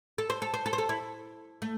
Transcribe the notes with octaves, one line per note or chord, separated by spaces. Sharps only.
A4
C5
A4
C5
A4
C5
A4
E4
A3